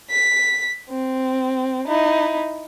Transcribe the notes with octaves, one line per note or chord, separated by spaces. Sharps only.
B6
C4
D#4 E4